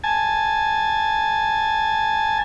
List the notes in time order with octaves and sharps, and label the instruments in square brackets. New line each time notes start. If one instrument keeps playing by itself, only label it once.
[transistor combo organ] G#5 A5